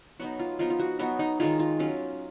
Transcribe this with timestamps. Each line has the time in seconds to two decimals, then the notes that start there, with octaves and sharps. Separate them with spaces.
0.20 F#3 B3 D#4 F#4
0.39 F4
0.59 F3 B3 D#4 F4
0.70 F4
0.80 F#4
0.99 F#3 B3 D#4 F#4
1.19 D#4
1.40 D#3 G#3 D#4 F4
1.59 F4
1.79 F#3 C#4 F4